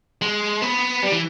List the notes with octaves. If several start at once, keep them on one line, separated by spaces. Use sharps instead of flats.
G#3
B3
G3
E3